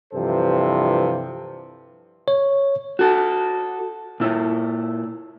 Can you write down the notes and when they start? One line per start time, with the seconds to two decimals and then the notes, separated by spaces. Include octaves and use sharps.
0.13 G2 C3 E3 F3 A4 C5
2.28 C#5
2.99 F#4 A4
4.20 A#2 E4